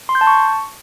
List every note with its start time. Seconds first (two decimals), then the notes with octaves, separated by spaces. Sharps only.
0.09 C6
0.15 G6
0.21 A5
0.27 C#6